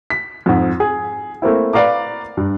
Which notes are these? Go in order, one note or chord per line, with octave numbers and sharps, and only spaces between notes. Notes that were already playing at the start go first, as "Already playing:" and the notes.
B6
F2 G#2
G#4
A3 A#3 C4 E4
B4 D5 F5 A#5 D6
G2